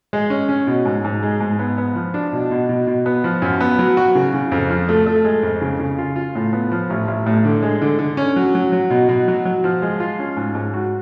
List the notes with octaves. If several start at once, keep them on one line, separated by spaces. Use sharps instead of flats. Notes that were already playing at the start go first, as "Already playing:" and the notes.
G#3
C#4
C#4
B2
G#2
G#2
G#3
G#2
B3
B3
F3
D4
B2
B2
B2
B2
B3
F3
F#2
B3
F#3
F#4
C#3
C#3
F2
F3
A3
A3
G#3
F2
C#3
C#3
F4
F4
A2
B3
F3
A1
A1
A2
D3
G#3
D3
D3
C#4
F#3
F#3
F#3
B2
B2
F#3
F#3
F3
G#3
F4
C#4
G#2
G#2
F#4